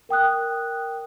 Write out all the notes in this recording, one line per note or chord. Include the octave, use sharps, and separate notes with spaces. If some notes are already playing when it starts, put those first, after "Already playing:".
A#4 G5 D#6 F#6